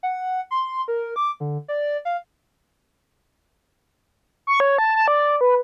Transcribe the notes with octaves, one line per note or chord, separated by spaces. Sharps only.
F#5
C6
A#4
D6
D3
D5
F5
C#6
C#5
A5
A5
D5
B4